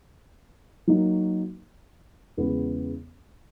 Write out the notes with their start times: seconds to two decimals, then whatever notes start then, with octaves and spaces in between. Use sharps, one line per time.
0.88 F#3 A#3 D#4 F#4
2.37 E2 C#3 G#3 B3